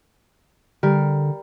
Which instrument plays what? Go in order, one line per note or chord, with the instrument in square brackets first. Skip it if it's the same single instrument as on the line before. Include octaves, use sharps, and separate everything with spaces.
[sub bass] D3 [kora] G3 A#4